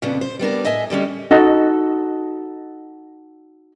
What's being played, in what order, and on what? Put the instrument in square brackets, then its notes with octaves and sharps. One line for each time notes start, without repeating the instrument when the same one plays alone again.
[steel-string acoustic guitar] F2 A#2 C#3 F3 B3 D4
C5
G3 B3 D4 A#4
A2 D#5 E5 G#5
D3 G3 G#3 C#4
[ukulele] D#4 F#4 A4 D#5